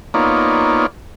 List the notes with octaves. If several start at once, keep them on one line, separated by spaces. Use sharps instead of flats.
A#3 B3 D#4 F4 C#5 D5